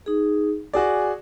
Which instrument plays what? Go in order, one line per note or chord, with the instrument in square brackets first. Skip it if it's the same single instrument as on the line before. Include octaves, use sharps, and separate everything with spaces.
[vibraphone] D#4 G#4
[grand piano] F#4 G#4 D5 [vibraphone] G#5